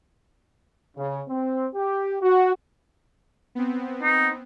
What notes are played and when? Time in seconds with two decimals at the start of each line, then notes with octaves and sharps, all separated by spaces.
0.96 C#3
1.29 C4
1.75 G4
2.22 F#4
3.55 B3 C4
4.02 D#4